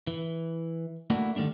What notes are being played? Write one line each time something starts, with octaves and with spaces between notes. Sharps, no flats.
E3
A3 A#3 D4 E4 F#4
D3 D#3 G3 A3 D4